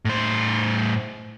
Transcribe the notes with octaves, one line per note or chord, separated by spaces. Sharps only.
A2 C5